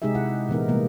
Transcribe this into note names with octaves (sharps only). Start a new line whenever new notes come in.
C3 G#3 D#4 G4 G#4 E5
C3 E4 F#5
A#2 E3 B3 D#4 A#4
C3 E3 G3 G#3 A#3 B3